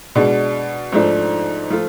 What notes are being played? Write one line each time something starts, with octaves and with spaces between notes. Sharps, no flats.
B2 G#3 D4
G#2 F3 A3 D4
F3 A3 F4